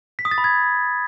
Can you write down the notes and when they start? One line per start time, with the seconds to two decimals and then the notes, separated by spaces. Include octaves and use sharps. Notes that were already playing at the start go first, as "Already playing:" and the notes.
0.19 B6
0.25 D#6
0.31 A6
0.38 B5
0.44 G#6